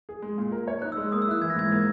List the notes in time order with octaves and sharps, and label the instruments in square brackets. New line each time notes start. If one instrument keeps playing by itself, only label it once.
[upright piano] G#4
G#3
A#2
A#4
C#5
[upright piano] D#4 [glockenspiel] F#6
[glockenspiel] E6
[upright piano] G#3
[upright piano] A#3 [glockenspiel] D#6
[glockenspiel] E6
[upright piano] E4 [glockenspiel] F#6
[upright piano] E3 [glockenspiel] G#6
[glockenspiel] A#6
[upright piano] G#2 [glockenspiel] G#6
[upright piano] A#3